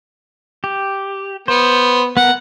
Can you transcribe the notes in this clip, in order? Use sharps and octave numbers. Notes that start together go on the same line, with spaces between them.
G4
B3 C5
B3 A#4 F#5